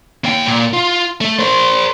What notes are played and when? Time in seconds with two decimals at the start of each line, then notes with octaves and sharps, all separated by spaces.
0.24 A#3 G5
0.48 A#2
0.73 F4
1.21 A3
1.39 A#4 C5